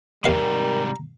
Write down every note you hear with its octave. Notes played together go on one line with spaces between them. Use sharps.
D#2 G#2 C3 G3 A#4 F5 A#5 B5